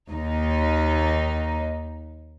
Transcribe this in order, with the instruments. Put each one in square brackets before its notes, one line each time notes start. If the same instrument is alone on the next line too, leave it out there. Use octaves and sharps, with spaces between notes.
[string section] D#2 D#4